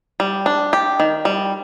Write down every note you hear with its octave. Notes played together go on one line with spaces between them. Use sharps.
G3
D4
G4
D#3
G3